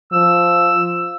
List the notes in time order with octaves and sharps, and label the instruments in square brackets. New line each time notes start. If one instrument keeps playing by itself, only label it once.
[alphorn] F3 [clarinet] E6